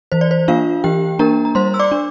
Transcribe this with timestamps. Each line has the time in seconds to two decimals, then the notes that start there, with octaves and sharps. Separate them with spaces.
0.12 E3 C5
0.21 D5
0.31 C5
0.48 A#3 D4 F4 F5
0.84 E3 G4 G5
1.19 A#3 D4 A#4 A#5
1.45 A#5
1.55 G3 C5 C6
1.74 E6
1.80 D5 D6
1.92 D4